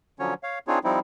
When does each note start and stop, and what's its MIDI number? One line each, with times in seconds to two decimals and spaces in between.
0.19 0.34 50
0.19 0.34 53
0.19 0.34 54
0.19 0.34 61
0.19 0.34 73
0.43 0.59 73
0.43 0.59 77
0.68 0.79 60
0.68 0.79 62
0.68 0.79 63
0.68 0.79 65
0.68 0.79 68
0.68 0.79 73
0.84 0.99 53
0.84 0.99 55
0.84 0.99 60
0.84 0.99 63
0.84 0.99 64